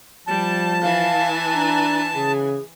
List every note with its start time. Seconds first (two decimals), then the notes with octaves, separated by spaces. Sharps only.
0.27 F3 G3 A5
0.83 E3 F5 G#5
1.55 D4 A#5
2.15 C#3 G#4